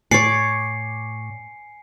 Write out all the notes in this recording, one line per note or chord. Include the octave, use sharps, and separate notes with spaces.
A2 C#5 D5 G#5 C7 C#7